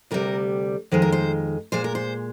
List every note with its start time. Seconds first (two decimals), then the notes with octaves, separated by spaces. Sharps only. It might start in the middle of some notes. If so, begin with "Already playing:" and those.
0.11 D2 C3 G3 A#4
0.91 F2 D#3 G#3 C5
1.02 A#4
1.12 C5
1.72 A#2 G#3 C5
1.84 A#4
1.95 C5